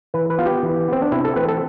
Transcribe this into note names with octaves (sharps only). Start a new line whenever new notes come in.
E3 B4
B4
B3 F4
G4
E3
B3 C4
D4
C3 E4
A4
E3 A3 C4 B4
A4